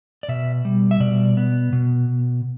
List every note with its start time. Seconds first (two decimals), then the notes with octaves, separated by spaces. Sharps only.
0.23 D5
0.28 B2 E5
0.65 G3
0.91 E5
1.00 B2 D5
1.37 B3
1.73 B2